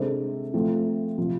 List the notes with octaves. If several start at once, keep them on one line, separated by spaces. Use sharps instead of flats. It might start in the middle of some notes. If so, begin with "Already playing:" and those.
Already playing: C3 G#3 D4 A4 C5
F3 A3 C4 F4
C3 F3